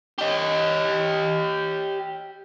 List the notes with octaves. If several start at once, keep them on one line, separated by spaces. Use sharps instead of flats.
G4 D#5